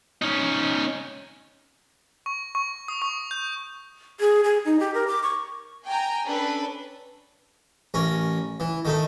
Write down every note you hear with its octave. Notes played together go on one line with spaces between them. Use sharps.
C#4 D#4
C#6
C#6
D#6
C#6
G6
G#4
G#4
D#4
G4
A#4
D6
C#6
G5 G#5 A#5
C#4 D4 A4 B4
A1 C#4 A#4
E3
D#3 A3 D#4